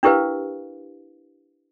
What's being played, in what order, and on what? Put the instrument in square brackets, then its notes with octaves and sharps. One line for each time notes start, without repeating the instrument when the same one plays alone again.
[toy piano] D4 E4 G4 A#4 B4 F5